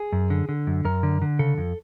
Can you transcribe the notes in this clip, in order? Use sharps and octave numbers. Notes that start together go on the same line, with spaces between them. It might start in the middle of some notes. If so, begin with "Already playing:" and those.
Already playing: G#4
F#2
D3
D3
F#2
F#2 A#4
D3
D3
C#3 A4
F2